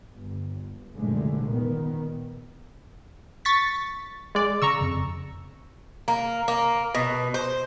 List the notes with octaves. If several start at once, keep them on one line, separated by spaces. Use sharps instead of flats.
G1
F#1 C2 A#2 D3 G#3 A3
A#2 D#3 B3
C#6 A6 B6
G#3 D5
C#3 A#5 C#6 E6
F2
A#3
A#3
B2
C5